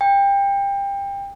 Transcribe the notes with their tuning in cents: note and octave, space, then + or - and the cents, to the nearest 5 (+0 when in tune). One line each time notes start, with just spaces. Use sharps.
G5 +25